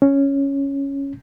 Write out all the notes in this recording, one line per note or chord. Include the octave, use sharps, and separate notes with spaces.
C#4